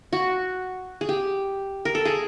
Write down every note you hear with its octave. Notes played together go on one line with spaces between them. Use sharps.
F#4
G#4
G4
A#4
A4
G#4